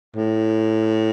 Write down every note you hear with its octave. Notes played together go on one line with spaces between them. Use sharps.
A2